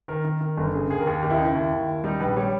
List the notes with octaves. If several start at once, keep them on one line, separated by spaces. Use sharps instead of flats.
D#3 A#4
D#3
D#3
G1
C#3 G#4
D#2 G#4
A#4
D#2 G#4
D#2 G4
E4
D#4
C#3
E4
D#2
D#2
D#2
G3 D#4
A#1 B4
G3 C#5